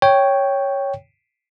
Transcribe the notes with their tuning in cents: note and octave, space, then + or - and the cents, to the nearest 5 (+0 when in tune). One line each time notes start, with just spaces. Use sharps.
C#5 +0 G5 +0